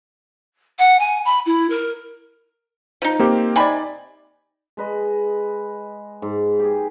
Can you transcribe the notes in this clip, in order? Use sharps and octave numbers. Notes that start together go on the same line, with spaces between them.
F#5
G#5
B5
E4
A#4
F3 D#4
A#3 C4 G4
C3 D#4 D5 G#5 B5
G#3 B4 D#5
G#2
G4 G#4